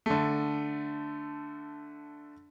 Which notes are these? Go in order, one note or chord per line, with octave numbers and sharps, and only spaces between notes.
D3 A3